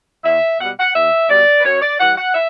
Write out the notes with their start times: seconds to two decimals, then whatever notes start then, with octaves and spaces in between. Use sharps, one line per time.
0.24 E2 E5
0.59 B2 G3 F#5
0.79 F#5
0.94 E2 E5
1.29 B2 G3 D5
1.59 B4
1.65 F#2 C#5
1.81 D5
2.00 E3 G3 F#5
2.16 F#5
2.34 E5